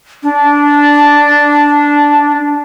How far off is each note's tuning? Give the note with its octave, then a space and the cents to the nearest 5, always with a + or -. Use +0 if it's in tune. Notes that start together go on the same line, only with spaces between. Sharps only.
D4 -10